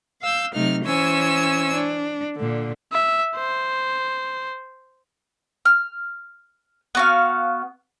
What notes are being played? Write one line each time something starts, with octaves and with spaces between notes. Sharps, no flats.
F5 E6 G6
C3 F#3 A3 D#4 F6
E3 C#4 C5 C#5 G#5 E6
D4
A#2 D3
E5
C5
F6
B3 F#4 F5